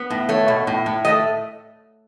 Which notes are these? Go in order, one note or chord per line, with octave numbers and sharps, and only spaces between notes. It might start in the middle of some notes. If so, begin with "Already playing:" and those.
Already playing: B3
A2
A3 C#5
B2
A2
A2
A3 D#5